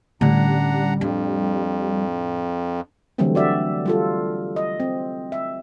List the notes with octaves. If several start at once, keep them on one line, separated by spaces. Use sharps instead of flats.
A2 D3 G3 C#4 D4 F#5 A#5
F2 D4
D3 E3 F#3 G3 A3 C4
F#4 D5 E5
G3 F4 A4
D#5
C4
E5